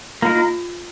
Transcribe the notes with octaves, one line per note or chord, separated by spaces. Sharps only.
A#3 D#4 F4 A#4
F4